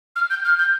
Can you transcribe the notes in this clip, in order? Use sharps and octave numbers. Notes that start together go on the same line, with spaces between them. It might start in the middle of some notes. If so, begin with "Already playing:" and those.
F6
G6
F6
G6